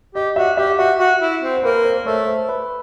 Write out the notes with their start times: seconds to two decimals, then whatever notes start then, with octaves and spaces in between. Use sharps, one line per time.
0.15 G4 D#5
0.36 F#4 E5
0.57 G4 E5
0.78 F#4 E5
0.99 F#4
1.21 E4
1.43 C4
1.57 C5
1.63 A#3 B4
1.84 C5
1.98 C5
2.06 A3 C#5
2.27 C5
2.49 B4